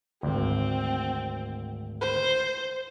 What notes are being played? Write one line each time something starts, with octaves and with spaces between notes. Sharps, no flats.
G#1 D2 C4
C5